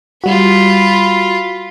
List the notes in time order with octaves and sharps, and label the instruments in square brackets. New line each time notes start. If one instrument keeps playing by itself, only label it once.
[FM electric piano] G3 F#4 [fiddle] F4 B5